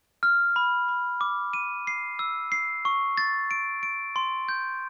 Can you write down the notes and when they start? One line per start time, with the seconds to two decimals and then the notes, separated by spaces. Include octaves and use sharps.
0.23 F6
0.56 B5
0.88 B5
1.21 D6
1.53 D#7
1.87 C7
2.19 E6
2.52 C7
2.85 C#6
3.17 A6
3.51 D7
3.83 D7
4.16 C6
4.49 G6